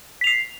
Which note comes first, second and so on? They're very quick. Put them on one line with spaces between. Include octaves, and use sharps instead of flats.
B6 F7 C7